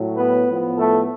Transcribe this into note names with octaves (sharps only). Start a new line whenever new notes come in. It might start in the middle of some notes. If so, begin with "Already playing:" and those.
Already playing: A2 F#3
B3 B4
A2 F3 B3
A3 A4